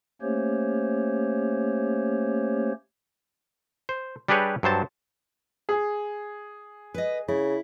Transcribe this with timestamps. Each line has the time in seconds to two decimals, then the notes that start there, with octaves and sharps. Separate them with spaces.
0.22 A3 A#3 C#4 G4 C5 C#5
3.89 C5
4.28 G3 D4 G4 G#4 B4 C#5
4.63 G2 F#3 C5 A5
5.69 G#4
6.94 B4 D#5
7.28 C#3 E4